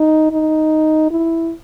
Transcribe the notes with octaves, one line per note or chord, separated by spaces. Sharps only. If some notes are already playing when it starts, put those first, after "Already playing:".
Already playing: D#4
D#4
E4